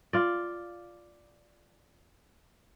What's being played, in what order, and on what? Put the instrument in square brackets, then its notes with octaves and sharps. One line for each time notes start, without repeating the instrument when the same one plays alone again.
[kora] F4 D5